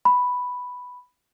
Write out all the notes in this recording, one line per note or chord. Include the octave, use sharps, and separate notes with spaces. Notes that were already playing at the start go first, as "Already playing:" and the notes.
B5